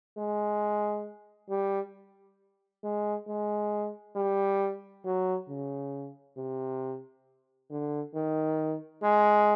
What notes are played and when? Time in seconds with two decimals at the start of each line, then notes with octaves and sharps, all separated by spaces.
0.18 G#3
1.50 G3
2.84 G#3
3.27 G#3
4.16 G3
5.05 F#3
5.49 C#3
6.37 C3
7.70 D3
8.15 D#3
9.03 G#3